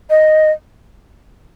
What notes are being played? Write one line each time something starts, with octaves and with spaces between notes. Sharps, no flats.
D#5